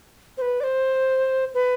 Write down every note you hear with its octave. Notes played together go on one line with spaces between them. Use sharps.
C5
B4
D5
C5
B4